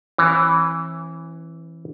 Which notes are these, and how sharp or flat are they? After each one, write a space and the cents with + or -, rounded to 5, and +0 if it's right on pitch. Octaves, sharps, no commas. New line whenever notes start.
E3 +0 C4 +45